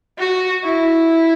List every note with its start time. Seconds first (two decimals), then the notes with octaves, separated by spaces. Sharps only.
0.19 F#4
0.64 E4